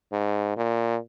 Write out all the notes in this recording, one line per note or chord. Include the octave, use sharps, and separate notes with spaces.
G#2
A#2